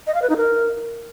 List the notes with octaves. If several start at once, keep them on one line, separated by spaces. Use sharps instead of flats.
D#5
F5
B4
D#4
A#4